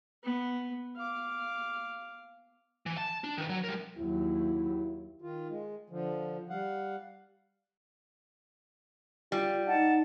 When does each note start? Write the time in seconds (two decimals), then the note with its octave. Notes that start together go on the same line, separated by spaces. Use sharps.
0.23 B3
0.96 F5 D6
2.86 E3
2.98 A5
3.24 D4
3.38 D#3 B4
3.49 F#3
3.64 G3 A#4
3.98 D#2 F#3 E4
5.22 D#3 F4
5.49 G#3
5.90 D3 F3
6.49 G3 F5 F#5
9.32 G3 F4
9.67 D#4 F#5 A5